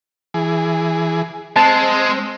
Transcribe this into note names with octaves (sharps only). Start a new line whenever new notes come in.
E3 G#4
G#3 C4 A5